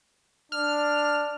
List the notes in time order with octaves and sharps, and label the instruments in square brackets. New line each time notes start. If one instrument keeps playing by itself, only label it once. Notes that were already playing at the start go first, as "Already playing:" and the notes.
[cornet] D4 [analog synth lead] F6